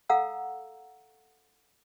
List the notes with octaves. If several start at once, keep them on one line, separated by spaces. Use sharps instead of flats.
A4 F5 F#5 A#5 E6